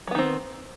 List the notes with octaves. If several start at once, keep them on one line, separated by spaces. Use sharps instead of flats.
D#3 F#3 B3 C4